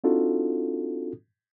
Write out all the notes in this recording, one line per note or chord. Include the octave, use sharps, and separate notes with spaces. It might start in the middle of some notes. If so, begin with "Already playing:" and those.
C4 D4 D#4 F4 F#4 A4